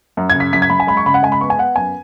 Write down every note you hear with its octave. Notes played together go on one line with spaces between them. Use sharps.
F#2
C#3 G#6
B6
F#2 B6
G#6
F#2 B5
G#5
G#3 B5
C#6
C#3 B5
F#5
G#3 G#5
B5
B3 C#6
G#5
B3 F#5
F#2 G#5